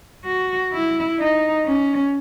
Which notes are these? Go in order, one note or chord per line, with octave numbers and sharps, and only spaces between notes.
F#4
E4
D#4
C#4